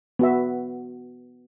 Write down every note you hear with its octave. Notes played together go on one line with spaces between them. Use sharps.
B3 F#4 E5